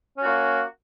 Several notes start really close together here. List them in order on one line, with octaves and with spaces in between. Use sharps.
C#4 F#4 A#3